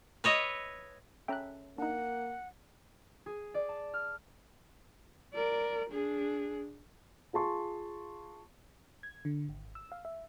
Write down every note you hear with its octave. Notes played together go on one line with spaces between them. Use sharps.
B4 C#5 D#5 E5
C#4 A4 E5 G5 A#5 F#6
A#3 D4 D#4 F#5
G#4
D5
A5
F6
A#4 D5
D4 G#4
F4 G#4 A5 C6 C#6
G#6
D3
G#1
E6
F5
E5